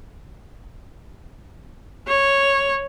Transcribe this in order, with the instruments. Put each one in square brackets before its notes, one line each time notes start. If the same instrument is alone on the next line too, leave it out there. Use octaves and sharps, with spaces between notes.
[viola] C#5